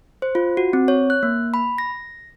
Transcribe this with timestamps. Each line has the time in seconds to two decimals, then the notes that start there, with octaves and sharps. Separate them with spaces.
0.22 C5
0.35 F4
0.57 F#4
0.73 C4
0.88 C#5
1.10 F#6
1.23 A#3
1.54 B5
1.78 A#6